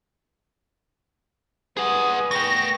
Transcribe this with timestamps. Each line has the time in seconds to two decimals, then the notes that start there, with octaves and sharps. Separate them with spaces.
1.77 G3 G#4 B4 F#5 G#5 D#6
2.31 A3 G5 C#6 A#6